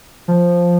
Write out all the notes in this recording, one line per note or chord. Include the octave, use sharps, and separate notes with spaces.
F3